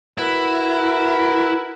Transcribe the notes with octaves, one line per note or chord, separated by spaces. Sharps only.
E4 F#4 A#4 B4